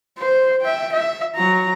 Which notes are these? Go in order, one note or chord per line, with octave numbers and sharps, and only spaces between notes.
C5
E5 G5
E5
F#3 A#5